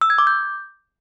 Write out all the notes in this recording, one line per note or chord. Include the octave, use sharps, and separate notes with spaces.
E6
G#6
D6
G6